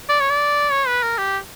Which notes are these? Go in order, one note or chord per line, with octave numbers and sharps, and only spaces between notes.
D5
C#5
D5
C#5
B4
A#4
G4